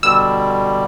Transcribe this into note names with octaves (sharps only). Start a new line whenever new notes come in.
B2 D3 G3 E6